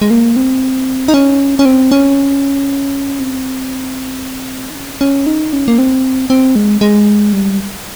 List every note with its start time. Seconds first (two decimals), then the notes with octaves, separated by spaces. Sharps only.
0.01 G#3
0.10 A#3
0.36 C4
1.08 D#4
1.14 C#4
1.59 C#4
1.65 C4
1.91 C#4
3.20 C4
4.70 D#4
4.75 C#4
5.01 C#4
5.26 D#4
5.53 C#4
5.68 A#3
5.78 C4
6.30 C4
6.56 G#3
6.81 G#3
7.33 G3